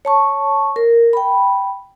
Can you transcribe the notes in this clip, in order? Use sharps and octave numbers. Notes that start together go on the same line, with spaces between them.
C#5 A5 C#6
A#4
G5 B5